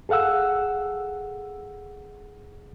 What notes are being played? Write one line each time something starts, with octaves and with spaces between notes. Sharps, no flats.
G#4 A4 F5 F#5 E6